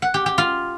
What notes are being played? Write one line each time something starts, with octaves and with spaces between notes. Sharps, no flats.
F#5
G4
G4
F4